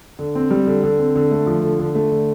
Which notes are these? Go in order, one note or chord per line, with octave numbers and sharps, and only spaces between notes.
D3
C4
G3
D3
D3
C4
D3
A3
F3
D3
D3
A3
D3